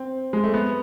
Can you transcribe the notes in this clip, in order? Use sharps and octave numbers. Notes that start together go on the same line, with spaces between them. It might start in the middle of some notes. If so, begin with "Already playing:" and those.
Already playing: C4
G#3
A3
B3